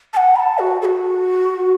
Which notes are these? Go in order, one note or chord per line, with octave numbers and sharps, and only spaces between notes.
A5
F#5
B5
A5
F#4
A4
F#4